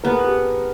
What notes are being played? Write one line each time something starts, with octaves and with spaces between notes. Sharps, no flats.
B3 G#4 A#4
G4 A4